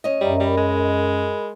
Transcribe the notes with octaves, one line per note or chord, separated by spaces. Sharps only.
C#4 D#5
F#2 G3 D5 E5 A#5
G3 A#4 B5
G#3